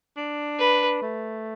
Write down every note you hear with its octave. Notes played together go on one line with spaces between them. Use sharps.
D4
B4
A3